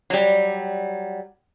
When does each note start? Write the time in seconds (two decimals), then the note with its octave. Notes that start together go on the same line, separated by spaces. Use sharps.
0.10 F#3 G3